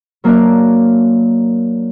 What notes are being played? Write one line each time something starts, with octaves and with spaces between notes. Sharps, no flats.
F#3 A#3 D4 A#4 D5 F#6